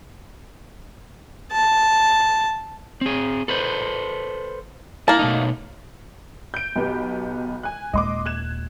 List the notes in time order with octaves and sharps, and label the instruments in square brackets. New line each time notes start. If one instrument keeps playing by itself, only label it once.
[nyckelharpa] A5
[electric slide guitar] C4 G#4
A4 B4 C5
[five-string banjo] A#3 A5 [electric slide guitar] E4
[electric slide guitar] B2 A3 D#4
[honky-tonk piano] G6 D7
B1 B3 G4
G#5 F#6
[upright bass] D#1 G#3 [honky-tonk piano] D#5 C6 D6
[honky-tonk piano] F#6 G#6 E7